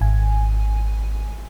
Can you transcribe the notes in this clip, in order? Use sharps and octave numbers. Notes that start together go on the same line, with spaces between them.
G#1 G#5